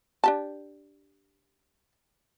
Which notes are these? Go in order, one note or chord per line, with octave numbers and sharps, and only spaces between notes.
D4 G4 A5